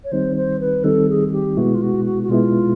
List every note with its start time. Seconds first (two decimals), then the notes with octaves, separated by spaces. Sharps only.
0.04 C#5
0.12 D#3 G3 C4 D#4 C5
0.36 C5
0.60 B4
0.84 D#3 G3 C4 D#4 A4
1.09 G#4
1.28 G#4
1.32 G4
1.57 B2 G#3 B3 E4 F#4
1.75 F4
1.82 F#4
2.05 F#4
2.23 F#4
2.29 B2 G#3 B3 E4 F4